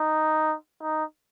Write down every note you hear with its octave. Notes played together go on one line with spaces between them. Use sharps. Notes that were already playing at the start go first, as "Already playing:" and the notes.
Already playing: D#4
D#4